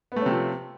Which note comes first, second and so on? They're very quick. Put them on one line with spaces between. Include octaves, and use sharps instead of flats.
B3 A3 C#4 C3 F3